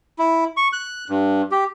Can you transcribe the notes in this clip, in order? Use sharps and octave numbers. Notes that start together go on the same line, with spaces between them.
E4
C#6
F#6
G2
G4